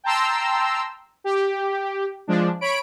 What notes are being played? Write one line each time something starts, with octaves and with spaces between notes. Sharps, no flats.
G5 A5 A#5 C6 E6
G4
F3 G#3 D4
C#5 B5 D7